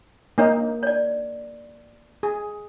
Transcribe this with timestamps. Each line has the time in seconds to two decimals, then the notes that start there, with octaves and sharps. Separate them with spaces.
0.38 A#3 D4 D#4 C#5
0.83 C#5 D5
2.23 G#4